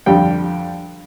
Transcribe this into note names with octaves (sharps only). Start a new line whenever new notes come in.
F2 D3 G3 G5